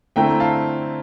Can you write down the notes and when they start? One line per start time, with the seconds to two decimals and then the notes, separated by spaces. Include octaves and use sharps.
0.16 D3 A3 C4 E4 G5 A#5
0.40 F5 A5